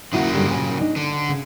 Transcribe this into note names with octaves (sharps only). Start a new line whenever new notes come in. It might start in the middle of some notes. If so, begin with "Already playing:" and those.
D#2 C#3 F#3 A#3 E4 F#4
G2 D3 G3
A#2 G#5
D4 D#4
D3 D4
C#3